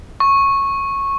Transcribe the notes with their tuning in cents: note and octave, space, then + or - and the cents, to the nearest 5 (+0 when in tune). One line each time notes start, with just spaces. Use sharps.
C#6 -10